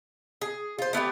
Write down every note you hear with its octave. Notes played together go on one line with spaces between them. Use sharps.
G#4
F4 C5
A3 B3 C#4 G4